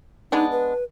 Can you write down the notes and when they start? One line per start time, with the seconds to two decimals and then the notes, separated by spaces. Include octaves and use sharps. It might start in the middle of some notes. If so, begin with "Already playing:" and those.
0.32 G#3 B3 D4 D#4
0.52 B4